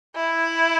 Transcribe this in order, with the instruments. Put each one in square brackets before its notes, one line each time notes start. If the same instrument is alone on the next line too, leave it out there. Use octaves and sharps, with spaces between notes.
[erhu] E4